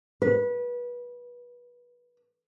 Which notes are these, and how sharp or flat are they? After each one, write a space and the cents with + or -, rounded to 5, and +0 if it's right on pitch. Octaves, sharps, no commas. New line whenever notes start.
B4 -25